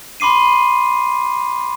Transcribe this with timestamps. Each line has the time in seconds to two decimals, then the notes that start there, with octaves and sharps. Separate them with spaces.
0.20 B5 C6 D6 C7 D#7